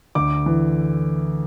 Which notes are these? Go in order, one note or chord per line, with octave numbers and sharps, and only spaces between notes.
D2 D6
E3